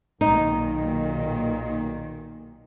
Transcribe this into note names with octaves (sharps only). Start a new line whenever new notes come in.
B1 A#2 D#3 D#4